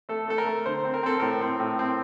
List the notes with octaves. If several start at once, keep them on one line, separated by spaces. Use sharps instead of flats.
A3 A4
A3 A4
A#4
A3
D3 C5
C4
A#4
C4 A4
A2 A#4
C4
A2
C4